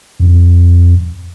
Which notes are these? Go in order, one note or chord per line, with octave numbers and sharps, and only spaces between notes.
F2